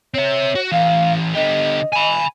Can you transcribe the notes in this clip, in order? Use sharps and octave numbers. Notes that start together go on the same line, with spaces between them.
C4 C#5 E5
F#4
E3 C#4 F5
D3 G4 D#5
G#5 B5